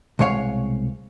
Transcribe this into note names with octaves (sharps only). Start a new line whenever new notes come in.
C2 B2 G#3 C#5 F5